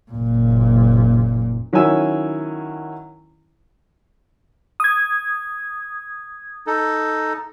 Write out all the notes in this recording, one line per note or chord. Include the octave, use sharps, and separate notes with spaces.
F#1 A#2
D#3 F#3 C#4 E4 G#5 E6
D#6 G#6
D#4 A4